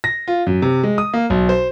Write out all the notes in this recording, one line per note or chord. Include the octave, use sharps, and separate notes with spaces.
A#6
F4
F#2
C3
G#3
D#6
A#3
B1
C5